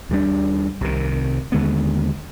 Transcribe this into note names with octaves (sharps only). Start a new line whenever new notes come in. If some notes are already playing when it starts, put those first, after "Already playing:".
D#2 D3 G3 D4
C2 C3 D#3
D#2 D3 G#3 B3